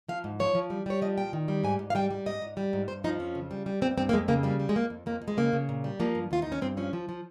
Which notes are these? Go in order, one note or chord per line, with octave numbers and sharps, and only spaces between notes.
F3 F5
G#2
F3 C#5
F3
G3
G3 C#5
F3 D#5
A#2 G5
D#3
G3
G#2 G#5
G#2
F5
G3 G5
G3
G#2 D#5
G#2
G3
G#2
G2 C5
F3 D#4
F2 C#4
C#3
G3
G3
G2 C4
G2 C4
A#3
F2 G#3
C#3 A#3
G3 A#3
G3
G#3
F2 A#3
F2
F2 A#3
F2
G#3
C#3 A#3
C#3
A#2
G3
F3 A#3
G2
D#2 F4
D#2 D#4
C#4
G2 C4
F3 C#4
F3
F3